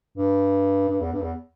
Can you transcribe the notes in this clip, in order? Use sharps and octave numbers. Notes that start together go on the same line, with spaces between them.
G2
G2
E2
G2
E2